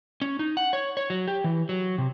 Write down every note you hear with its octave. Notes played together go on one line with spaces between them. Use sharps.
C#4
D#4
F#5
C#5
C#5
F#3
G4
E3
F#3
C3